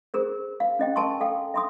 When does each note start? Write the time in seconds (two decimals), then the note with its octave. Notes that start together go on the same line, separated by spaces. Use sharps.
0.14 G#4 A#4 C5
0.60 F5
0.79 C#4 D#5 G5
0.96 A#4 G#5 A5 C6 C#6
1.20 A4 F5 G5
1.54 E5 C6 D#6